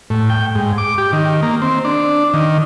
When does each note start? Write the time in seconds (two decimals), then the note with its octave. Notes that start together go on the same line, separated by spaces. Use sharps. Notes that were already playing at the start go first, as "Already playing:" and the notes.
0.10 A2
0.30 G5
0.55 G#2
0.78 D6
0.98 G4
1.13 D#3
1.43 A#3
1.62 C4
1.85 D4
2.34 D#3